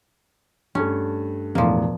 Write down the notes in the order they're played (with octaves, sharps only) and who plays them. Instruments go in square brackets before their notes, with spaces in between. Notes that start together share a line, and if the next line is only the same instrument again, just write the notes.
[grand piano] G2 A3 [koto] C#4
[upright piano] E1 A2 [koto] F3 A#3